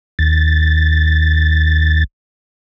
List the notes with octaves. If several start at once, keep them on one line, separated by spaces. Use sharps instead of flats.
D#2 A6